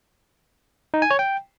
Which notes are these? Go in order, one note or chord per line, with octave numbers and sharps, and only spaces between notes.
D#4
G#5
C#5
G5